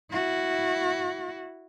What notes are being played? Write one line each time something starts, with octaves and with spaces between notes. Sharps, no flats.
E4 F#4